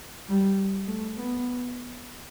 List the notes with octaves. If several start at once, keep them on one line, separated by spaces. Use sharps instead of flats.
G3
A3
B3